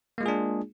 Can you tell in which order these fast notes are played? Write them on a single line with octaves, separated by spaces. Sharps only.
A#3 G#3 F4 G#4 D4